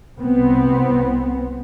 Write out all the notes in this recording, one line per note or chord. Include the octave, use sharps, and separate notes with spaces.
C2 B3 C4